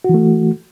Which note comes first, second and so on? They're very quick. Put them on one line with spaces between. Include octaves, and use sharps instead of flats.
F#4 E3 A3